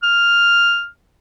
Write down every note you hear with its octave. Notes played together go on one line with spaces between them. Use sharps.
F6